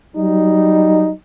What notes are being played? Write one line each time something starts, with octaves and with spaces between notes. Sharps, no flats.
F#3 G3 D#4